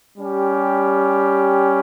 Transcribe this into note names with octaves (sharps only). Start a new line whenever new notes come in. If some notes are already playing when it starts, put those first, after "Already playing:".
G3 C#4 G4